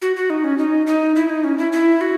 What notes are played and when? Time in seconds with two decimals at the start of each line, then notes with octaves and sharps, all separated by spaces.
0.02 F#4
0.16 F#4
0.30 D#4
0.44 C#4
0.58 D#4
0.87 D#4
1.15 E4
1.30 D#4
1.44 C#4
1.58 E4
1.72 E4
2.01 F#4